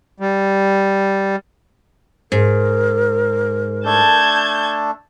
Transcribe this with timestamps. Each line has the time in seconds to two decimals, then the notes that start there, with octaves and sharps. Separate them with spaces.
0.20 G3
2.32 G#2 A#4
3.85 A3 D4 A4 A5 G6 G#6